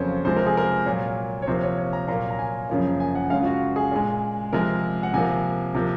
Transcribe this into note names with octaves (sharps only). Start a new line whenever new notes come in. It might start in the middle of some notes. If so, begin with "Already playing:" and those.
Already playing: F2 C#3 F#3 A#3 C5 C#5
C3 F3 G#3 C5
A#4
G#4
A#4
A#2 F#3 A#3
C#5
C3 F3 A#3 C5
C#5
C#5
A#5
A#2 F#3 A#3 A#5
A#5
G#5
F#2 C#3 F3 A#3
G#5
F#5
F#2 C#3 G#3 F5
F4
F#4
G#4
A#2 G#3
C3 F3 G#3 A#4
F#5
C3 F3 A#3 G#5
C3 F3 A#3